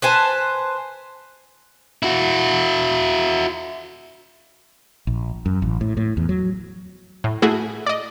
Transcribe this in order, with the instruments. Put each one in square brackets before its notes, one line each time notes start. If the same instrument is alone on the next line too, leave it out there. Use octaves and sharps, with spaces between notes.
[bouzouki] B4 C5 G#5 A5
[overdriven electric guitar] E4 F#4
[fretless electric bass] A#1
F#2
A1
A2
A2
E2
F#3
[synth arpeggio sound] A2
A3 E4 F#4 G#4
D5 D#5